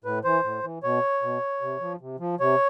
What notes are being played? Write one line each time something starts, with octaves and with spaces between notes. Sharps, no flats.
A2 B4
E3 C5
A2
E3
B2 C#5
B2
C3
F3
C3
F3
C3 C#5